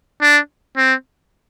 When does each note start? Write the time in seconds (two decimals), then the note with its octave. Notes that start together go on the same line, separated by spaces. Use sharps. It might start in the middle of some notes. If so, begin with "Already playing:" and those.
0.22 D4
0.77 C4